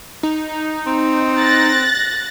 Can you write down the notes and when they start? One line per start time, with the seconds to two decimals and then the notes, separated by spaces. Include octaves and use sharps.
0.23 D#4
0.86 C4
1.38 F#6 A6 A#6